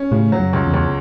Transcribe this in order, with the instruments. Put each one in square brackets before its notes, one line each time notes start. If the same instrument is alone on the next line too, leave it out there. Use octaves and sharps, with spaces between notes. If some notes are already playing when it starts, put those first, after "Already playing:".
Already playing: [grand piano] C#4
[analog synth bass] A2 [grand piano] C#3
[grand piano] F#3
[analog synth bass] F#2
[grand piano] C#2
[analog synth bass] E2
[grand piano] C#2